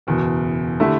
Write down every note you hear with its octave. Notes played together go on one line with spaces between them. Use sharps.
F#1 E2 B2
D3 A3 E4 G4